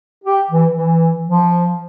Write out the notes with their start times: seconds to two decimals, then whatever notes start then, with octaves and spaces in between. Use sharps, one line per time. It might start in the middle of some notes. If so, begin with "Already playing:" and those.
0.25 G4
0.51 E3
0.73 E3
1.27 F3